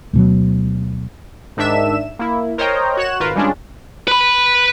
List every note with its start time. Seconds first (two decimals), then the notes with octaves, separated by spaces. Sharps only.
0.13 D2 B2 F#3
1.57 G#2 D#3 D4 E5 E7
2.19 A#3 E4
2.58 A#4 C5 C#5 D#5 G5 A#5
2.97 F#4 C#5 F#6 E7
3.20 G#1 F4 A#4 B4
3.35 G3 G#3 C#4 D4 F4
4.08 B4 B5